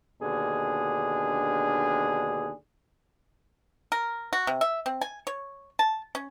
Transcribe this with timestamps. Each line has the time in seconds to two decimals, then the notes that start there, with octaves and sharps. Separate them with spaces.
0.21 D#2 B2 D3 D4 G#4
3.92 A#4
4.33 F#4
4.47 C3
4.61 E5
4.86 C4
5.01 G#5
5.27 C#5
5.79 A5
6.15 C#4